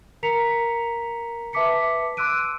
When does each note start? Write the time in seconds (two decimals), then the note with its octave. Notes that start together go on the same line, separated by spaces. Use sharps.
0.23 A#4 A#5 B6 C#7 F7
1.53 B4 E5 A5 D6 B6 C#7
2.17 C6 D6 E6 F#6 D7 D#7